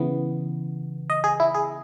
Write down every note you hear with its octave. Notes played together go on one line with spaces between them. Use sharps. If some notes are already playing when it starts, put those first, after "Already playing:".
Already playing: C#3 E3 B3
D#5
G#4
E4
G#4